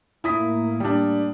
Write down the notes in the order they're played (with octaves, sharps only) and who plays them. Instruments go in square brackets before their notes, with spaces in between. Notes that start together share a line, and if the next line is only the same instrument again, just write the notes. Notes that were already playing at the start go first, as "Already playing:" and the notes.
[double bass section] A2 A#3 [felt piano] E4 D#6 B6
[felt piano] G3 D4